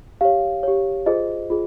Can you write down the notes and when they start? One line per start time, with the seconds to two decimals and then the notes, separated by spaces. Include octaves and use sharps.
0.21 G4 C#5 F5
0.63 G4 C#5
1.06 F4 G#4 C5 D#5
1.50 F4 G#4